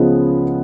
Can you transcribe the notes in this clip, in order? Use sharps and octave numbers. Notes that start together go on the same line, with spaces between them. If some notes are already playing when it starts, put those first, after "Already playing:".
Already playing: C#2 C#3 F3 G#3 B3